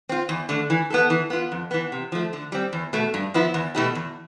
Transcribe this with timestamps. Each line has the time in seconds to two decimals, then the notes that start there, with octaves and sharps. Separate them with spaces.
0.09 C4 F4
0.29 E2
0.49 D3 A3
0.70 E3
0.90 B3 E4 A4
1.10 E3
1.30 B3 F4
1.52 F2
1.71 E3 B3
1.92 C3
2.12 F3 A3
2.33 D3
2.52 G3 C4
2.73 E2
2.93 B2 A3
3.14 G2
3.34 F3 B3 E4
3.54 E2
3.75 B2 A3 E4 G4
3.95 E2